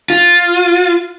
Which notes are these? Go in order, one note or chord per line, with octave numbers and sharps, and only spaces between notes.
F4